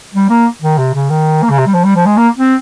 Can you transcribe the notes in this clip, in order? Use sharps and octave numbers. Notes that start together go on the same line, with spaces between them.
G3
A#3
D#3
C3
C#3
D#3
A#3
C#3
C3
G3
F3
G3
F3
G#3
A#3
C4